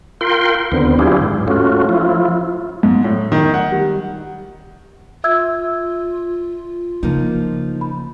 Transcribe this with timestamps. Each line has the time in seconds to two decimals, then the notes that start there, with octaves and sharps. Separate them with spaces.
0.21 F4 A#4 G5 C6
0.72 D#2 D3 B3 C4
0.99 F#3 D4 E4 F4 G4 G#4
1.22 G#2
1.48 A3 C#4 F4 F#4
1.89 F3 E4 F4
2.83 G#2
3.04 A2
3.32 D#3
3.54 F#5
3.72 G3
5.24 F4 E5 E6 G#6
7.03 C#3 F3 A#3 D#4
7.81 B5